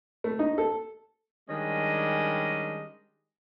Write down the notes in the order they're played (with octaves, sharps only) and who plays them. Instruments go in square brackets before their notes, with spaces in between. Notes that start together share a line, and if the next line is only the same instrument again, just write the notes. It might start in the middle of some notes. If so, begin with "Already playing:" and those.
[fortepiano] A3
D#4
A4
[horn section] D#3 G3 G#3 C#4 D4 D#5